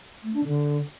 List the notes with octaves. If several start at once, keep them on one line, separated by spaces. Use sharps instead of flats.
A3
D4
D3